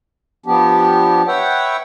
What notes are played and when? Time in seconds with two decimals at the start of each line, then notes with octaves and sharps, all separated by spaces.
0.46 F3 B3 D4 G4
1.28 B4 C#5 E5 F#5 G5